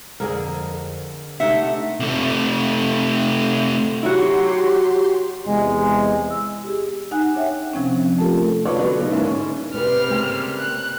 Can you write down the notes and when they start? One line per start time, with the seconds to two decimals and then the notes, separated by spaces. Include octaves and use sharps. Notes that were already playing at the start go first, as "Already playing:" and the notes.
0.20 F2 D3 G#4 A#4
1.40 C3 A3 D4 D#4 E5 F#5
2.00 C3 A3
4.03 F#3 E4 F#4 G4 C6
5.46 E2 C3 G#3
6.30 E6
6.64 G4 G#4
7.11 D#4 F#5 G#5 F#6
7.34 D4 C#5 E5 G5
7.74 C3 F3 C4 C#4
8.18 A3 D4 F4 G4 A4 A#4
8.65 F4 A4 B4 C#5 D5
8.78 B2 F#3 B4
8.99 C#3 B3 D#4
9.11 G#2 A#3 C#4 D4 E4
9.24 C#4
9.74 C3 G3 B3 B4 F6
10.09 C#3 A#3 G5
10.59 F#6